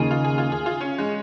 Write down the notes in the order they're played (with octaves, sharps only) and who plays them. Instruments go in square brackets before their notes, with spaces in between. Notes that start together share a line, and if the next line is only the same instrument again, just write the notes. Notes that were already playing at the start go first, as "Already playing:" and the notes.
Already playing: [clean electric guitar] D#2 C#3 A#3 D#4 [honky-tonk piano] F4 G#4
[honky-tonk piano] F4
G#4
F4
G#4
F4
C#4
G#3